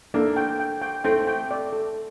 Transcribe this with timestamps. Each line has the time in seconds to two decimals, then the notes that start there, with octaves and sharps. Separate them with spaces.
0.14 A#3 D4 A4
0.36 G5
0.60 G5
0.82 G5
1.04 A3 C4 G5
1.27 G5
1.51 D5
1.73 A4